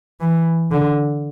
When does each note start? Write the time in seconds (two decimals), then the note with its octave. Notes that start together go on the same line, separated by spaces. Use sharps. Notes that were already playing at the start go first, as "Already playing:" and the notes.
0.21 E3
0.71 D3